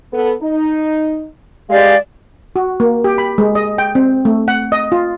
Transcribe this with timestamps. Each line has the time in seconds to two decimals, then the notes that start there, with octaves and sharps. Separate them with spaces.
0.13 B3 A4
0.41 D#4
1.69 G#3 G4 D5 F5
2.56 F#4
2.80 A#3
3.04 G4
3.18 B5
3.38 G#3
3.55 D#5
3.78 G5
3.95 C4
4.25 A3
4.48 F#5
4.72 D#5
4.92 F4